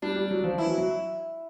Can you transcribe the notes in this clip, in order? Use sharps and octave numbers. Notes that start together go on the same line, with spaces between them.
G3 D4
G3
F#3
F3
E3 E4
F#3
F#3